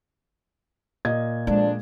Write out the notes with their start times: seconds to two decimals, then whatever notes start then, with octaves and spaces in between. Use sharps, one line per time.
1.05 A#2 D#5 G#6
1.47 F2 G#3 D4